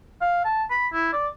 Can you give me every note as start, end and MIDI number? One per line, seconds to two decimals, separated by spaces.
0.21 0.40 77
0.45 0.64 81
0.70 0.88 83
0.93 1.08 64
1.13 1.28 74